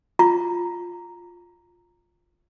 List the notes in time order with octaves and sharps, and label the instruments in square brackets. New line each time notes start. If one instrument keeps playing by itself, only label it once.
[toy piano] F4 A#5 C#6